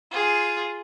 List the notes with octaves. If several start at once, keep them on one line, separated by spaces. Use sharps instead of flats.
F4 G#4